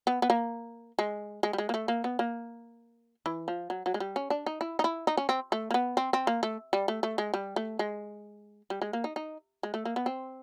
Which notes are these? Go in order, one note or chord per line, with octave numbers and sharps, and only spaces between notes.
B3
B3
A#3
G#3
G#3
G3
G#3
A#3
A3
A#3
B3
A#3
E3
F3
F#3
F#3
G#3
G3
C#4
D4
D#4
E4
D#4
E4
D#4
C#4
C4
A3
A#3
B3
C4
C4
A#3
A3
G3
A3
A3
G#3
G3
A3
G#3
G3
G#3
A#3
D#4
D#4
G#3
A3
A#3
B3
C4